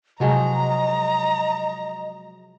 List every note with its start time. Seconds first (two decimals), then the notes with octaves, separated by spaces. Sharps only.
0.20 C3 F3 F#3 G#3 D#5 A#5